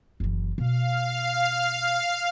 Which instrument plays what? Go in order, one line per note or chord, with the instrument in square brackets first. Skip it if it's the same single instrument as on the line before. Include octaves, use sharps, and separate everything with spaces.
[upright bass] F#1 E3
[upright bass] B2 [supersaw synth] F5